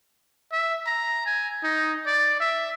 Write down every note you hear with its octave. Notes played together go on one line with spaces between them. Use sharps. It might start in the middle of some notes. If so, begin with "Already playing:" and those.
E5
A#5
G#5
D#4
D5
E5